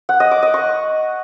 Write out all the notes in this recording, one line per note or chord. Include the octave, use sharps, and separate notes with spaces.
F#5
D#5
D6
D#5
C#6